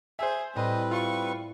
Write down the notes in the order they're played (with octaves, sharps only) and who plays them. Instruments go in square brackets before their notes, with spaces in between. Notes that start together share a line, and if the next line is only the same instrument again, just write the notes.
[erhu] G#4 [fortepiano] C5 E5
[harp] A2 [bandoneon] G3 C4 B4 [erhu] D#5
[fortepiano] F4 [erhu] C#6